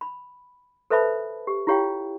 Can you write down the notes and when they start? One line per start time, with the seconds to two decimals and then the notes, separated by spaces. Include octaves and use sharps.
0.01 B5
0.90 A4 B4 C5 E5 A5 B5
1.47 G4
1.67 E4 F4 G4 C#5 F5 G5